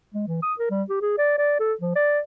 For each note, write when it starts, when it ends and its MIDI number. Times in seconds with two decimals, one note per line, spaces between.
0.14 0.24 56
0.28 0.40 52
0.42 0.54 87
0.59 0.69 70
0.70 0.83 55
0.90 0.98 67
1.02 1.16 68
1.18 1.37 74
1.38 1.55 74
1.60 1.73 69
1.81 1.93 53
1.95 2.19 74